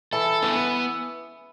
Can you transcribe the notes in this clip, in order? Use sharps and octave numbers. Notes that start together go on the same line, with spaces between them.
E3 E4 A4
E3 B3 E4